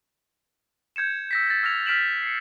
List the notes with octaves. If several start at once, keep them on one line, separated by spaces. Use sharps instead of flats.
G6 G#6 C#7 E7
E6 A#6 B6
A6
E6 F6 G#6 A#6 F7
F6 B6 D7 E7 F#7
C7 C#7